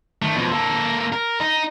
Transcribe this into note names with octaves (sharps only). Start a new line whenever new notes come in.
D#3 A3
F2 B2
A#3 A4
A#4
D#4